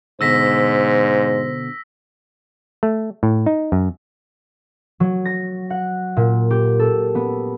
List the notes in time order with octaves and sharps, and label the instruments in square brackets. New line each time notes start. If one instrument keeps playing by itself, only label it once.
[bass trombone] G#2 [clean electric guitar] B2 D3 [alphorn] C5 [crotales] E6 A#6 B6
[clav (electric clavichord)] A3
A2
D#4
F#2
[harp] F#3
A#6
F#5
A#2
G4
A4
B3